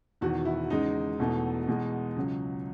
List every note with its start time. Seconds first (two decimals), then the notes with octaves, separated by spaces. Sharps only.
0.21 E1 E2 D#3 F#4
0.45 E4
0.70 E2 C#3 G#3 D#4
1.19 E1 E2 B2 A3
1.68 E2 B2 G#3
2.16 C#2 C#3 F#3